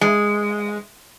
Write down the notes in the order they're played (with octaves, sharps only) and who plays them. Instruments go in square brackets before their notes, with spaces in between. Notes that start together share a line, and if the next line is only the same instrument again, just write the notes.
[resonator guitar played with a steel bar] G#3